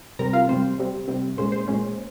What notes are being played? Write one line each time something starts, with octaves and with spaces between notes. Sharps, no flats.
C3 G3 C4 A#4 A#5
F4 F5
C3 G3 C4 C5
C3 G3 C4
C3 G3 C4
A#2 G#3 C#4 C5
C5
A#2 G#3 C#4